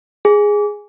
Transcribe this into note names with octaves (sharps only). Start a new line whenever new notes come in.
G#4